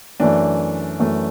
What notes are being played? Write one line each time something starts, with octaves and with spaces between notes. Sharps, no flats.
F#2 E3 A3 D4
F#2 E3 A3